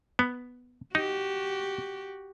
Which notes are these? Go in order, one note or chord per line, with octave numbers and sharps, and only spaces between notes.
B3
D#4 F#4 G4